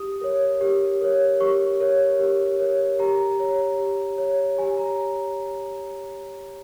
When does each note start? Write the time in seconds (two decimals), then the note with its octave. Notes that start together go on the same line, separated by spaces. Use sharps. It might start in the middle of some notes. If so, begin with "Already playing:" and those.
Already playing: G4 D#6
0.21 A#4 C#5
0.61 G4
1.01 A#4 C#5
1.40 G4 C#6
1.80 A#4 C#5
2.19 G4
2.60 A#4 C#5
2.99 G4 A#5
3.39 C#5
3.78 G4
4.18 C#5
4.58 G4 G#5
4.78 A#5